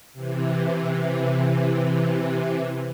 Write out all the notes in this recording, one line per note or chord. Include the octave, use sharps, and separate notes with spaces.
C3 E3